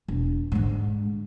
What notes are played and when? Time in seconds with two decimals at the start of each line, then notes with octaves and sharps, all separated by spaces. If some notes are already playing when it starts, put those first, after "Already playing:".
0.08 E1
0.52 G#2 D3